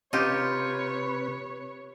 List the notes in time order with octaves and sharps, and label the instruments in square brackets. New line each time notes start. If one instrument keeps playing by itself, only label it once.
[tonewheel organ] C3 B4 [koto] D#4 F4 G4 [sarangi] C#5